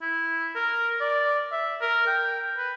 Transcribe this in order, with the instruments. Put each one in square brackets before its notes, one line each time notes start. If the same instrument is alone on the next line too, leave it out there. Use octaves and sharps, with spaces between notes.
[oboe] E4
A#4
D5
E5
A#4
G5
B4